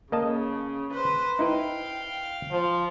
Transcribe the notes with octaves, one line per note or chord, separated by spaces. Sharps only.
C#3 A#3 D#5 A5
B4 C5
D#4 E4 B4 F5 G5
F3